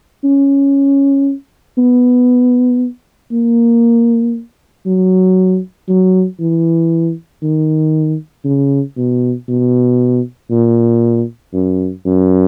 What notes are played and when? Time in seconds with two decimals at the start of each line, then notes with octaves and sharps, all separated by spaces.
0.24 C#4
1.78 B3
3.32 A#3
4.86 F#3
5.89 F#3
6.39 E3
7.43 D#3
8.45 C#3
8.97 B2
9.49 B2
10.51 A#2
11.54 F#2
12.06 F#2